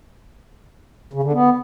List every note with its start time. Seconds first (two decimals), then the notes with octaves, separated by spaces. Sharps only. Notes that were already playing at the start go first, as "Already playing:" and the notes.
1.13 C#3
1.23 D3
1.33 B3